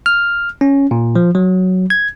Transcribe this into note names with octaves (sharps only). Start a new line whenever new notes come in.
F6
C#4
A#2
F3
F#3
G#6